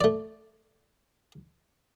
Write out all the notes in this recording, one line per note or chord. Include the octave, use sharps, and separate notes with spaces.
A3 D5